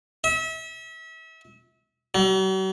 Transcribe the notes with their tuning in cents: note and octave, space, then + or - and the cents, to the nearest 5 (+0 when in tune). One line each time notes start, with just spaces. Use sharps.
E5 -35
F#3 +45